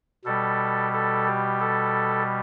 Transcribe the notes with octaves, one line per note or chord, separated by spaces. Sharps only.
B2 G3 A4
A4
G4
A4